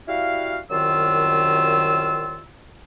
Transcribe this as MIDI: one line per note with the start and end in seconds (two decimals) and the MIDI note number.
0.08 0.58 55
0.08 0.58 64
0.08 0.58 66
0.08 0.58 77
0.71 2.44 36
0.71 2.44 42
0.71 2.44 51
0.71 2.44 65
0.71 2.44 88